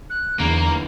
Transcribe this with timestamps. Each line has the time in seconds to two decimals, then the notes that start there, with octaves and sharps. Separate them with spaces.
0.10 F#6
0.40 E2 D3 E3 A#3 A#5
0.60 A#5